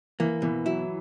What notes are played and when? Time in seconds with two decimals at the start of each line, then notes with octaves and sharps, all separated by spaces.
0.20 E3 A#3
0.42 B2 E3
0.65 F#3 E4